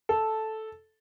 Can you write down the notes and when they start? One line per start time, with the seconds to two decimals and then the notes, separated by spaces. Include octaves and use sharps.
0.09 A4